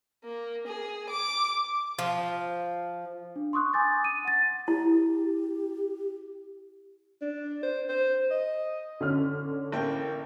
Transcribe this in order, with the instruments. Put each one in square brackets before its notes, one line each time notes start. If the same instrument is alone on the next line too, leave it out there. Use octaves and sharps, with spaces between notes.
[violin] A#3
G#4
D6
[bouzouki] F3
[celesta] D4
C6 C#6 D#6 F#6
G#5 C6 D6 D#6 G6 A6
D#7
F#5 A6
[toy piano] E4 [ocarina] G4
[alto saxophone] D4
C5
C5
D#5
[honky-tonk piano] D3 C#4 F6
[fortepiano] A1 A#3 G5